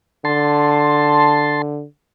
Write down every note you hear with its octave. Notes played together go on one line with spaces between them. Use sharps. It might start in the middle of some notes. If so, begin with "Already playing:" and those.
D3 A5 C6